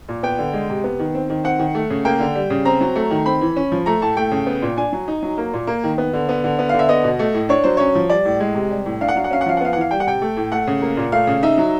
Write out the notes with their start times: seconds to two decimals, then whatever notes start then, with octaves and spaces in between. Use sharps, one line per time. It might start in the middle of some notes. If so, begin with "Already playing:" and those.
0.09 A#2
0.23 B3 G5
0.39 D3
0.53 G#3
0.70 C3
0.84 B3
0.99 D#3
1.14 C4
1.30 D#3
1.44 C4 F#5
1.59 D#3
1.75 A3
1.90 C#3
2.05 A#3 G5
2.20 D3
2.35 G3
2.50 C#3
2.65 C4 A#5
2.81 F#3
2.96 A3
3.11 D#3
3.26 C4 B5
3.41 E3
3.56 C#4
3.72 F3
3.86 A3 A#5
4.01 A2 A5
4.17 A3 G5
4.31 C#3
4.47 B3
4.62 A#2
4.77 D4 G#5
4.93 F#3
5.08 D#4
5.23 F#3
5.38 A#3
5.53 A#2
5.67 A#3
5.84 D#3
5.98 B3
6.13 D3
6.29 B3
6.44 D3
6.59 B3
6.69 F5
6.74 D3
6.79 E5
6.89 B3 D#5
7.04 B2
7.19 A3
7.34 A2
7.49 D4 C#5
7.64 F#3 C5
7.77 C#4 C#5
7.95 F3
8.10 G3 D5
8.25 A2
8.40 G#3
8.55 C3
8.71 G3
8.86 A2
9.01 D4 F5
9.08 F#5
9.16 F#3 F5
9.24 F#5
9.31 C#4 F5
9.41 F#5
9.46 F3 F5
9.57 F#5
9.61 B3 F5
9.73 E3 F#5
9.81 F5
9.91 G3 G5
10.00 F#5
10.07 C3 G5
10.22 A3
10.37 A2
10.52 A3 F#5
10.67 C#3
10.82 A#3
10.97 A#2
11.12 A3 F5
11.27 C#3
11.43 D#4 E5
11.58 F#3